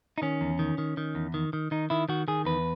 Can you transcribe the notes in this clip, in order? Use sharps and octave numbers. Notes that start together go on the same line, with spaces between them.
D#4
D#3 C#4
E2
D#3
D#3
D#3
E2
D#3
D#3
D#3 D#4
D#3 E4
D#3 F#4
D#3 G#4
E2 B4